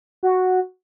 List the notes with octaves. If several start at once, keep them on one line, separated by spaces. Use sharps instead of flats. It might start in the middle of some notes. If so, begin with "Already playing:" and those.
F#4